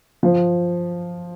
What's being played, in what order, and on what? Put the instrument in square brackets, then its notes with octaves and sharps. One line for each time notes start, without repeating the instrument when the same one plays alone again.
[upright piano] F3